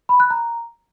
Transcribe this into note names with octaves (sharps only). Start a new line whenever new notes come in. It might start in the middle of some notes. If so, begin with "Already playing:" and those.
B5
F#6
A#5